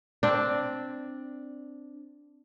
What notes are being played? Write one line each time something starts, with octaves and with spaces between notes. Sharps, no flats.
C4 D4